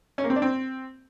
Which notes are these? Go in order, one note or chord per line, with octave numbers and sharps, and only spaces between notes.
C#4
A#3
C4
D4
C4